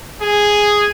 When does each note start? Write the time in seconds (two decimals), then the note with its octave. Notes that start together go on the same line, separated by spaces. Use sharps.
0.21 G#4